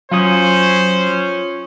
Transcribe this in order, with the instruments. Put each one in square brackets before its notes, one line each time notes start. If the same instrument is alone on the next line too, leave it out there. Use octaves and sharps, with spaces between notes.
[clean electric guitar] F#3 [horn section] C#4 [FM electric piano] F4 D#6 [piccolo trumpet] C5